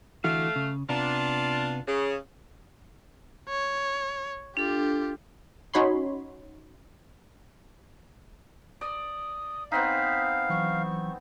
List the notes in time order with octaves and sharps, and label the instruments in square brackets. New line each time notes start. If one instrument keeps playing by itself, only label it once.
[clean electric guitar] D3 E3 F#4 [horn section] A3 F5
[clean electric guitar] C#3
[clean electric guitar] C3 B3 A#5 [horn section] D4 F4
[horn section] C#3
[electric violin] C#5
[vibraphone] D4 A4 [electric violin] F4 G4
[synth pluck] C#4 D#4 F#4 C#5 B5 C6
[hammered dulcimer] D5 [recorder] D#6
[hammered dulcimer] B3 C4 D#4 [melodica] F5 [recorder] B6
[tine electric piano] E3 F#3 [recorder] C#6